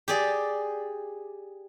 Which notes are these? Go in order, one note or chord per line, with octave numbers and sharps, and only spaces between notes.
G4 G#4 D5